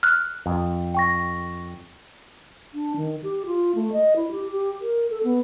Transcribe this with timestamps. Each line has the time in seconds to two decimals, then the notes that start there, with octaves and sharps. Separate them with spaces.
0.03 F6 F#6
0.46 F2
0.95 G5 C#6 A#6
2.74 D4
2.96 D#3
3.23 G4
3.46 F4
3.75 A3
3.92 D#5
4.16 E4
4.32 G4
4.51 G4
4.81 A#4
5.10 A4
5.24 B3